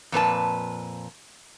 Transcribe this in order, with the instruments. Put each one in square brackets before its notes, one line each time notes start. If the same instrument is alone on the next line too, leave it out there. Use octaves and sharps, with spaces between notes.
[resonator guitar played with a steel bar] F2 A#2 B4 A5